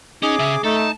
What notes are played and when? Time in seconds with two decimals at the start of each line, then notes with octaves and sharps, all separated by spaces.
0.23 C#4 D#4 G#4 D6
0.39 C#3 E5
0.64 A3 D#4 A4
0.76 A5